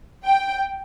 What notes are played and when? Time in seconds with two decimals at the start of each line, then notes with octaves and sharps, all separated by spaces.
0.24 G5